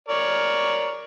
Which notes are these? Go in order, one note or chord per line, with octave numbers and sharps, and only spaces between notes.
A#4 C#5 D5